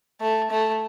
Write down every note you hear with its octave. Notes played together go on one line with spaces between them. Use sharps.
A3
A3